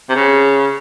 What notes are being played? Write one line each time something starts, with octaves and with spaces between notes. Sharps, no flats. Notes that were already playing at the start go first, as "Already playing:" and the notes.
C3
C#3